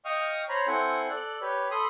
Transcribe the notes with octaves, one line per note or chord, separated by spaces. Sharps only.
D#5 F5 G5 C#6 D#6 F6
C5 C#5 A#5 B5
C4 E4 A4 C5 F#5 G#5
A4 D5 F#6
G4 B4 C#5
A4 B5 C6 D#6